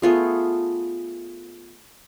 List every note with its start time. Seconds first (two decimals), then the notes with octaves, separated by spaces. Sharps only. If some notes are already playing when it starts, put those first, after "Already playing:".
0.02 A3 B3 F4 G#4